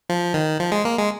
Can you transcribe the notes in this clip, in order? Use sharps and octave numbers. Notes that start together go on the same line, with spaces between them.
F3
D#3
F3
G#3
A#3
G#3